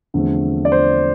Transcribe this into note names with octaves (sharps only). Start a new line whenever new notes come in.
E2 D3 F3 A3 C4
D5
C5